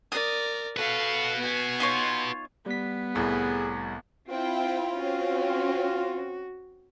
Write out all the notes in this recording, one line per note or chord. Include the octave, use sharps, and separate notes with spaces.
A#4 D5 D#6
F#4 A4 B4 F5
B3 G#5
D#4 F4 C#5
G3 B3 B6
C2 A2 G#4
C4 E4 F4 G5
C4 C#4 F#4